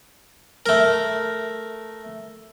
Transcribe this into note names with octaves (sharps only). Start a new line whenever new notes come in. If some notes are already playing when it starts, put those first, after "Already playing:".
A3 A#4